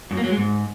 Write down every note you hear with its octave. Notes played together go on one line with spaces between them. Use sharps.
F#2
A#3
F#3
G#3
G#2